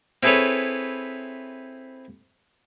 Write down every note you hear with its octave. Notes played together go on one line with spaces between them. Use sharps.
C4 E4 G#4 A4 B4 C#5